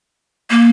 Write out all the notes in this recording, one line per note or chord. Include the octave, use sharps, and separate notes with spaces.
A#3